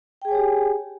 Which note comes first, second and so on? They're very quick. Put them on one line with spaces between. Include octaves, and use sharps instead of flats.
G5 G#4 G#5 C#5 G4